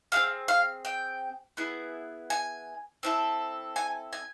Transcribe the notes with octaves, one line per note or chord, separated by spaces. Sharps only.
C4 F4 G#4 F5
F5
G5
B3 E4 G#4
G#5
C4 E4 A4
G#5
G#5